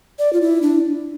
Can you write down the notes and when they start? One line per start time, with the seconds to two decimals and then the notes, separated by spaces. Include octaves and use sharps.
0.19 D5
0.33 F4
0.41 E4
0.62 D4